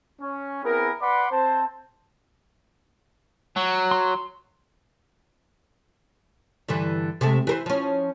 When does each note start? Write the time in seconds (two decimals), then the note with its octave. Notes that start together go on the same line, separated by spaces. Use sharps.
0.21 C#4
0.64 B3 C4 E4 G#4 A#4
1.01 B4 D5 F#5 B5 C6 D6
1.31 C4 C5 A5
3.56 F#3
3.91 C6
6.68 G2 D3 E3
7.21 C3 G#3 A3
7.47 E3 A#4 C5
7.66 F3 C#4